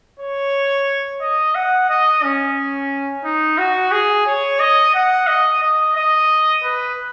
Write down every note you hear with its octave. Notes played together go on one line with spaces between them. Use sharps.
C#5
D#5
F#5
D#5
C#4
D#4
F#4
G#4
C#5
D#5
F#5
D#5
D#5
D#5
B4